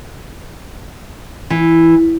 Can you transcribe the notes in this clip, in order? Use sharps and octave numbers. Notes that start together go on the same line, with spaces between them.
E3